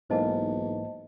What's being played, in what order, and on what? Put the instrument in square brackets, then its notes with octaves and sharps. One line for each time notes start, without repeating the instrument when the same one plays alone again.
[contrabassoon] B1 [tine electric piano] G#2 E3 A#3 [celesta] C5 D#5 A5